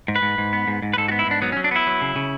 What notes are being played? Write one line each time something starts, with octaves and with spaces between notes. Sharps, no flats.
G#2
B4
G#2
G#2
B3
G#2
G#2
B4
G#2 A4
F#4
B3
E4
G#2 D4
F#3 B3
C#4
F#3
D4
B3 E4
F#3
C#3
C#3